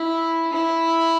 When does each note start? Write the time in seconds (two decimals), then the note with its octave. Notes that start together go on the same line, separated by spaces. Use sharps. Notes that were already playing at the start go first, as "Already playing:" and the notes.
Already playing: E4
0.53 E4